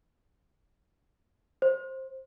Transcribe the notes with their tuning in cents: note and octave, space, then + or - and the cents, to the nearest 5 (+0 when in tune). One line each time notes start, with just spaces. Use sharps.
C5 +15